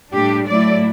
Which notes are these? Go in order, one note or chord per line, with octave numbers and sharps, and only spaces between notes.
A2 G3 D4 G4
A2 F#3 A3 E4 D5